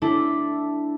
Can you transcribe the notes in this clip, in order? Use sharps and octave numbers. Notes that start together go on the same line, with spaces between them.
A3 D4 E4 A4